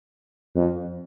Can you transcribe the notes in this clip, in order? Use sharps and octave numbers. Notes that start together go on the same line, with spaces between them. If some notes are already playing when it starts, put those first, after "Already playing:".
F2